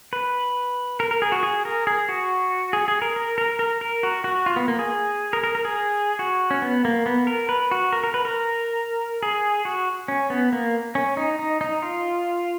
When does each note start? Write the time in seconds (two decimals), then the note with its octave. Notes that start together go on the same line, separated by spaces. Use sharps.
0.13 B4
1.00 A#4
1.11 A#4
1.22 G#4
1.32 F#4
1.43 G#4
1.65 A#4
1.87 G#4
2.09 F#4
2.73 G#4
2.88 G#4
3.02 A#4
3.16 A#4
3.38 A#4
3.59 A#4
3.81 A#4
4.03 F#4
4.24 F#4
4.46 F4
4.56 B3
4.68 A#3
4.79 G#4
5.33 A#4
5.44 A#4
5.55 A#4
5.65 G#4
6.19 F#4
6.51 C#4
6.62 B3
6.85 A#3
7.06 B3
7.27 A#4
7.49 B4
7.71 F#4
7.93 A#4
8.04 A#4
8.14 B4
8.25 A#4
9.23 G#4
9.65 F#4
10.08 C#4
10.30 B3
10.53 A#3
10.95 C#4
11.17 D#4
11.39 D#4
11.61 D#4
11.82 F4